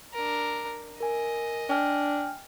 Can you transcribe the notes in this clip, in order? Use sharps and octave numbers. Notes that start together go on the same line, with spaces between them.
D4 A#4
A#4 D#5 G#5
D4 G5 G#5 F6